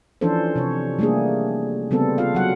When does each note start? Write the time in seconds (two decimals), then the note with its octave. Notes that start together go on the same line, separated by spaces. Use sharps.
0.21 E3 F3 C#4 D4 A4 C5
0.56 C3 C#5
0.99 G3 A3 A#3 D4 G#4
1.91 C#3 G3 B3 C4 A4
2.18 F4 F5
2.35 F#3 F#5